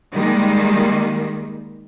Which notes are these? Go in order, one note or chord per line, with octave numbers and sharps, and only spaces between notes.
D#3 G3 G#3 A#3